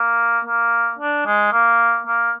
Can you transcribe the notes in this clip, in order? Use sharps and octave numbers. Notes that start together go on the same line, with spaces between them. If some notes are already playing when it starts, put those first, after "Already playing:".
Already playing: A#3
A#3
D4
G#3
A#3
A#3